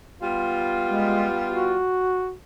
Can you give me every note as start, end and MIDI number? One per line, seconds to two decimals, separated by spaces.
0.21 1.76 55
0.21 1.76 59
0.21 1.76 65
0.86 1.26 56
1.49 2.34 66